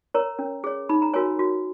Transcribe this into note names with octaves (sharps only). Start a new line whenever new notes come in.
A#4 C#5 A#5
C#4
G#4 C#5
D#4 B5
A#5
F#4 A#4 C#5 G#5
F#4